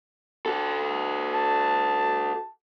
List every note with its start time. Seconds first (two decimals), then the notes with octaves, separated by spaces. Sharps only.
0.46 F#4 A4
1.34 A5